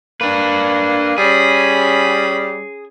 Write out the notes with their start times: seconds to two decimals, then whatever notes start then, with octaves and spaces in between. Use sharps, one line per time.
0.21 A#3 D4 B4
1.18 G3 C#4 G#4 B5